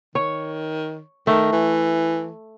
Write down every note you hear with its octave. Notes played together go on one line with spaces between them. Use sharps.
D#3 C#5
D#3 A3
E3